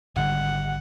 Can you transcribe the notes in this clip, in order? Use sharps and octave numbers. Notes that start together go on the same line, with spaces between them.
G#1 D3 G3 F#5